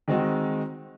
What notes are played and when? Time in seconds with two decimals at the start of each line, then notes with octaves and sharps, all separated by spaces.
0.08 D#3 G#3 C4 D#4 F#4